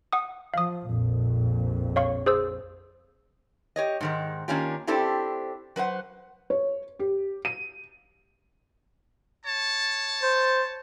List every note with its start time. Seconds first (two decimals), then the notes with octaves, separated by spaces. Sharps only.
0.13 F#5 D#6
0.54 F3 F5 D#6
0.87 A#1 F2 A#2
1.96 C#5 F5 C#6
2.26 G#4 C5 E6
3.76 G4 C#5 D#5
4.01 G#2 D#3 G#3
4.48 D#3 A#3 C#4 D4 F4 G4
4.87 C4 D4 E4 G4 A4 C5
5.76 F#3 B4 C5 F#5
6.50 C#5
6.99 G4
7.45 D#7
9.44 C#5 A5
10.23 C5